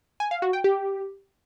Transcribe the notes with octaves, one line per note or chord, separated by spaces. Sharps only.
G#5
F5
F#4
G5
G4